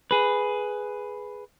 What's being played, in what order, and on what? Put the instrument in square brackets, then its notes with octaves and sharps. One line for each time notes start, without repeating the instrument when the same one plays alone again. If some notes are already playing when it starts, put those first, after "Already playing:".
[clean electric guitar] G#4 B4